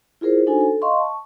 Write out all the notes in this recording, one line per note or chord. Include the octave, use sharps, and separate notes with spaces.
E4 F4 G#4 A#4 C5
D4 D#4 F#4 A4 C5 G#5
A4
D#5 F5 C6 C#6
A5 C#6